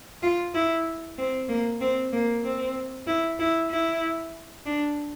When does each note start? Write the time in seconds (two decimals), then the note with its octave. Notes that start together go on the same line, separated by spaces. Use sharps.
0.23 F4
0.54 E4
1.18 C4
1.48 A#3
1.81 C4
2.13 A#3
2.44 C4
3.07 E4
3.39 E4
3.71 E4
4.66 D4